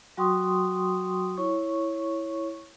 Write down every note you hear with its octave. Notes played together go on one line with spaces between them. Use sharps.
F#3 F#4 G5 C6 C#6 D#6
E4 C#5 C#6